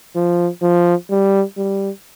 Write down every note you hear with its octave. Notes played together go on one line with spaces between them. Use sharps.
F3
F3
G3
G3